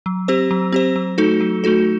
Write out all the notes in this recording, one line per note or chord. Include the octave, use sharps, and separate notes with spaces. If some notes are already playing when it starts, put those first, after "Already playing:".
F#3
C4 G4 C5
F#3
C4 G4 C5
F#3
A3 D#4 F#4 A4
F#3
A3 D#4 F#4 A4